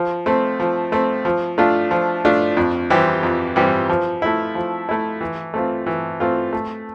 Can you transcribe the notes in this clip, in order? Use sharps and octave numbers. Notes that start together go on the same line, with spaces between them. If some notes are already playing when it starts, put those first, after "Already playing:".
Already playing: F3
A3 C4
F3
A3 C4
F3
A3 D4 F4
F3
A3 D4 F4
F2
E3 G3 C4 G4
F2
E3 G3 C4 G4
F3
A3 E4
F3
A3 E4
E3
A3 C4 F4
E3
A3 C4 F4
A3